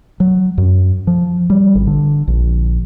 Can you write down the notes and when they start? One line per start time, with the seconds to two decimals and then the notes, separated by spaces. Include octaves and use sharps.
0.20 F#3
0.58 F#2
1.07 F3
1.50 G3
1.75 G#1
1.87 D3
2.28 A#1